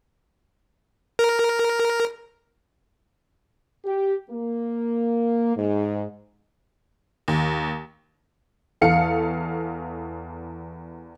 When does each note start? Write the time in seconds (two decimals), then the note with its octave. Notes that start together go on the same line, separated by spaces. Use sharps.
1.19 A#4
3.85 G4
4.29 A#3
5.56 G#2
7.28 D#2
8.81 E2 A4 F5 C#7